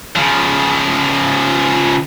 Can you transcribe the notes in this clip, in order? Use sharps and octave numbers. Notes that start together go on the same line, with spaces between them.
C#3 F3